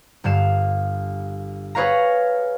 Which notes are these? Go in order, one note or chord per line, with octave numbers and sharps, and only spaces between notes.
G1 G2 F5 E7
G#4 B4 C#5 F5 A#5